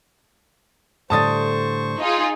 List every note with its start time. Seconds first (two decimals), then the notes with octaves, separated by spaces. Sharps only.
1.10 A2 D3 G3 C5 A5 C#6 D#6 A6
2.00 D#4 F4 G#4